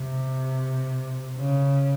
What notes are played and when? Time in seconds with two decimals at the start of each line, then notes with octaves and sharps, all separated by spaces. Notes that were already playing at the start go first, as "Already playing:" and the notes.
Already playing: C3
1.36 C#3